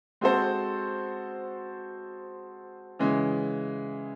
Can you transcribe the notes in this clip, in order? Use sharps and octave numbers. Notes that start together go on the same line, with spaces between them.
G#3 C4 F#4 A4 C5
C#3 E3 G#3